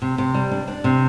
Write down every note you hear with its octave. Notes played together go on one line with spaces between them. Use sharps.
C3
C3
G3
D4
D4
C3